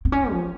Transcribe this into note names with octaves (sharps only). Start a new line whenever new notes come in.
C4
C#4
F3